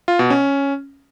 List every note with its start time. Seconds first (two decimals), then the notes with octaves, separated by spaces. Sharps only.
0.08 F4
0.19 B2
0.30 C#4